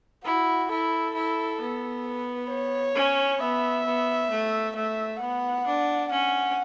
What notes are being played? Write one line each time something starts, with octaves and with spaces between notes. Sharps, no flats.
E4 F#4
E4 A4
E4
B3
B4
C#5
C#4
B3 E5
B3
A3
A3 E5
B3 F#5
D4
C#4 F#5